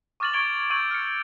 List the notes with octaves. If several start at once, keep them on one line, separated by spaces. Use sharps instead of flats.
C#6 D6 F6 A6 D#7 F#7
C#6 G#6 D7 F7 G7
C#6 E6 G6 G#6 D#7 F#7
F6 C#7